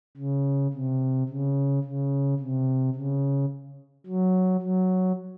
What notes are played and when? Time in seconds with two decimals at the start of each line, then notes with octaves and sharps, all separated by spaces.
0.17 C#3
0.73 C3
1.29 C#3
1.84 C#3
2.39 C3
2.95 C#3
4.07 F#3
4.62 F#3